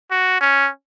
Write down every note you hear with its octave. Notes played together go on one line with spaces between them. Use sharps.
F#4
C#4